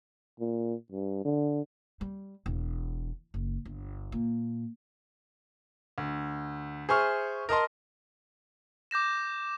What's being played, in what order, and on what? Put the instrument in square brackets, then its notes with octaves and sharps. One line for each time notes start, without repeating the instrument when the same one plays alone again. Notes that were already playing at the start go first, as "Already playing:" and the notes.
[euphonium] A#2
G2
D3
[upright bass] G3
E1
F#1
G1
A#2
[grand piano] D2
G#4 C5 E5 G#5 C#6 F6
A#4 D#5 A5 C6
[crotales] D6 G6 A#6 E7